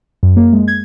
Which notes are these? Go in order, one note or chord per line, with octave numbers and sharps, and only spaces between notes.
F#2
A#3
G#3
G#6